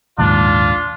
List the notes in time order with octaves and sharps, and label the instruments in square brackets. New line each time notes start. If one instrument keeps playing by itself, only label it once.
[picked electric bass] A#1 D#2 G#2 [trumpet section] D4 F4